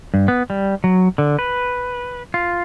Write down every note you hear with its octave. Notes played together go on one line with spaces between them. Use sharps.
G2
B3
G3
F#3
D3
B4
F4